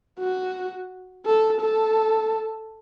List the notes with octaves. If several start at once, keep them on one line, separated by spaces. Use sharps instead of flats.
F#4
A4
A4